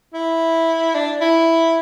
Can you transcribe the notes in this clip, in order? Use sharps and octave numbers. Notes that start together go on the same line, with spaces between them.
E4
D4
E4